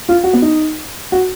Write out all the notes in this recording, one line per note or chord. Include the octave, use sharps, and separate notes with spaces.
F4
F#4
B3
D#4
F#4